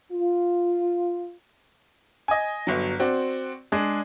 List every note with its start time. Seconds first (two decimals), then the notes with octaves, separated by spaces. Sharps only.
0.12 F4
2.28 D#5 G#5
2.67 G1 F#3
3.00 C4 F#4 D5
3.72 G#3 D4 G#4